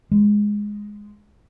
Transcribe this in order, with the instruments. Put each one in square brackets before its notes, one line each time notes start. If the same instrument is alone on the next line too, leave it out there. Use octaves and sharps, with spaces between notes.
[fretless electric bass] G#3